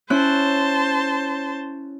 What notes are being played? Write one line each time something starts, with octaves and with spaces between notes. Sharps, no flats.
C#4 E4 C5 A5 F#6